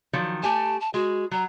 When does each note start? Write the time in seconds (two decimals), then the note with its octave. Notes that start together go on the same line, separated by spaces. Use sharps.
0.13 D#3 F3 F#3
0.43 A3 G4 G#5 A5
0.80 A5
0.94 G#3 F#4
1.31 F#3 A#5